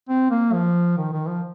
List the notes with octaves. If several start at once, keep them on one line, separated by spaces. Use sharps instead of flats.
C4
A#3
F3
D#3
D#3
F3